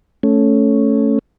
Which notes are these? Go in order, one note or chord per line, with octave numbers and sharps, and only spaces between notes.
A3 C#4